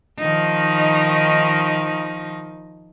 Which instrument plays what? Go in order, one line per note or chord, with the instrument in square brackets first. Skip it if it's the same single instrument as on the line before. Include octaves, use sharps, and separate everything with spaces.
[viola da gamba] D#3 F3 D#4